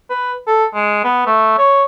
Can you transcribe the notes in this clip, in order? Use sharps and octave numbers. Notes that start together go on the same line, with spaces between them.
B4
A4
G#3
B3
A3
C#5